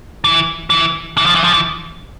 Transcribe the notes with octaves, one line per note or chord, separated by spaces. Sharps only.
E3
E3
E3
F3
E3
F3
E3